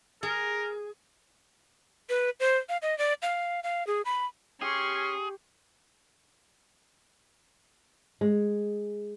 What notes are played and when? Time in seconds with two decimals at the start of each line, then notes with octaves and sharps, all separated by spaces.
0.23 G#4 A#4
2.09 B4
2.40 C5
2.69 F5
2.82 D#5
2.98 D5
3.22 F5
3.63 F5
3.87 G#4
4.05 B5
4.62 C#4 G4 G#4 C6 C#6
8.21 G#3